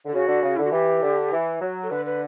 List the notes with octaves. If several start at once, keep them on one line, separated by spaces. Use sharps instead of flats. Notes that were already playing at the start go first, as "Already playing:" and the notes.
D3
C#3 F#4
D3
C#3
D3 E4
F#4
E3 G4
D3
E3
F#3
A4
D3 B4
B4